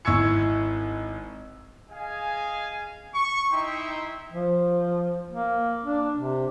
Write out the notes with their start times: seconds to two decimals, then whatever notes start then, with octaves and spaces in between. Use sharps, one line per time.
0.05 G#1 E4 C#6 E6 G#6 C#7
1.91 G#4 D#5 F5 G#5
3.14 C#6
3.51 D#4 E4 E5 G5 C6
4.31 F3
5.31 A#3
5.85 D4
6.17 C3